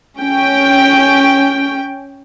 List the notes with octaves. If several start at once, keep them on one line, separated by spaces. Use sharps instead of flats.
C#4 G5